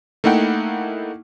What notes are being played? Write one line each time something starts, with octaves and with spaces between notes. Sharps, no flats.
A3 A#3 D#4 E4 F#5 G5